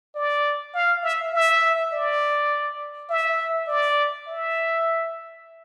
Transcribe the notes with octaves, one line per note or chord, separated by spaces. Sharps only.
D5
F5
E5
E5
D5
E5
D5
E5